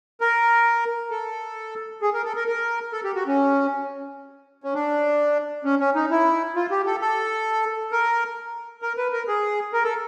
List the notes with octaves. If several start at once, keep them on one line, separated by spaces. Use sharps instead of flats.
A#4
A4
G#4
A#4
A4
A#4
A#4
A4
G4
F#4
C#4
C#4
D4
C#4
C#4
D#4
E4
F4
G4
A4
A4
A#4
A#4
B4
A#4
G#4
A#4
A4